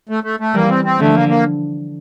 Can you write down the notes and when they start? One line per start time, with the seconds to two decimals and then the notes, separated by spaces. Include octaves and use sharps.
0.09 A3
0.24 A3
0.40 A3
0.54 E3 G3 A#3
0.69 C4
0.85 C4
0.99 D3 F3 A3
1.14 A#3
1.29 A#3